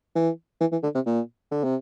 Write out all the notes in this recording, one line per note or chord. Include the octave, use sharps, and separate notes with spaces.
E3
E3
E3
D3
C3
A#2
D3
C3